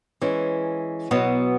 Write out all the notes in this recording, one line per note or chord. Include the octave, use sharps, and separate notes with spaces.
E3 G#3 C#4
B2 F#3 B3